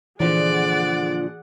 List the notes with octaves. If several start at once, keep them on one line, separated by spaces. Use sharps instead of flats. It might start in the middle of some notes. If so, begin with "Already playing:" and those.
A#2 D3 E3 F3 G#4 D5 F#5